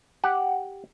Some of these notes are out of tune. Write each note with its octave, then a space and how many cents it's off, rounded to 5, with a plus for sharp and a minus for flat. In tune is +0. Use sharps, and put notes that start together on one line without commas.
G4 +0 F#5 +0